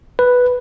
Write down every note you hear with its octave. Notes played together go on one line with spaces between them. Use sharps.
B4